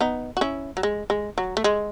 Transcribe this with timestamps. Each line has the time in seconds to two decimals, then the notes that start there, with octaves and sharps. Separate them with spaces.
0.01 B3 D#4
0.37 F#4
0.41 C#4 E4
0.77 F#3
0.83 G#3
1.10 G#3
1.38 F#3
1.57 A3
1.64 G#3